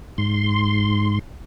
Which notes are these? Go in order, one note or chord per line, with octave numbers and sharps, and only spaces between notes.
G#2 C6